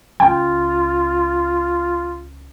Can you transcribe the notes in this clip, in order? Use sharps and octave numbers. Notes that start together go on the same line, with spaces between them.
C#2 F4 G5